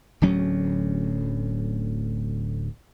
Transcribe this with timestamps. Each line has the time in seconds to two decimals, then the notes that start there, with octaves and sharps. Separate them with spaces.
0.22 D1 D2 F#3 C#4